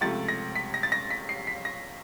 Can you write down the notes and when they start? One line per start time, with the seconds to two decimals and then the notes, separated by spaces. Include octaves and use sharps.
0.01 C#2 C3 F3 A3 A6
0.28 A#6
0.55 B6
0.74 A#6
0.83 A6
0.92 A#6
1.11 B6
1.29 C7
1.47 B6
1.65 A#6